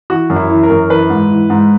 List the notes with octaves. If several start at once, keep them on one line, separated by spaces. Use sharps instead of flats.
E3 F#4
F#2
E4
E3
A#4
F#2
E3 B4
G#2
E3
G#2